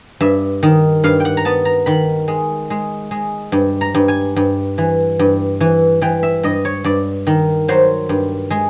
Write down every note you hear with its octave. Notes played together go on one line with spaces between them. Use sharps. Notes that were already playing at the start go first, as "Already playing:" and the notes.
G2 E5
D#3
G2 F5
G5
F#5
A#5
B3 A5
A#5
D#3 B5
G#3
G#3
G#3
G2
A#5
G2
G#5
G2
E3
G2
E3
E3 G5
E5
G2 D#5
C#5
G2 D5
D#3
F#3 C5
G2
G#3